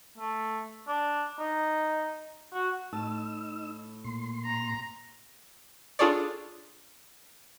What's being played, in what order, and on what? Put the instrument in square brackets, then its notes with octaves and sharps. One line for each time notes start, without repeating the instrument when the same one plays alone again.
[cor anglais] A3
D4
D#4
F#4
[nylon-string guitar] A2 A5 [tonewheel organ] D#4 E6
[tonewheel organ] A#2 C6
[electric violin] A#5
[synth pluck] D4 F4 G#4 A4 C#5 D5